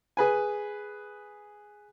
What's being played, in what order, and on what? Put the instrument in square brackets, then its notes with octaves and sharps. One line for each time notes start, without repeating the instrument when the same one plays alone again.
[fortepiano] G#4 B4 G#5